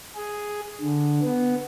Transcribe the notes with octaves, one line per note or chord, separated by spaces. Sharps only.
G#4
D3
B3